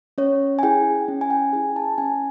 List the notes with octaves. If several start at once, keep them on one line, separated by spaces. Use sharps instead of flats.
C#4 C#5
G#5
E4 G#4 G5
C#4
G#5
G5
E4 G#4 G#5
A5
C#4 G#5